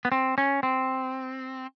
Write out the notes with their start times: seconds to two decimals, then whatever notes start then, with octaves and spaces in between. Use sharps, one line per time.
0.05 B3
0.12 C4
0.38 C#4
0.63 C4